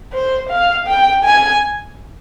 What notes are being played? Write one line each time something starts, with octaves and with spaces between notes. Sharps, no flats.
C5
F5
G5
G#5